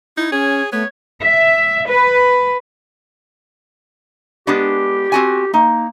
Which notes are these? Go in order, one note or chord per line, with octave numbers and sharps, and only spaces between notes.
D#4 E4
C#4 G#4 C#5
A3 B3 C#5
E5
B4
G#3 B3 D4 G4
C4 F#4 G#5
A#3 D#4